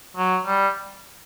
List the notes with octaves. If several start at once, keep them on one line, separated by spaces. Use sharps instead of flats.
F#3
G3